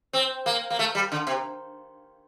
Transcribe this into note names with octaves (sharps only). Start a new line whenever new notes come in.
C4
A#3
A#3
A3
G3
D3
C3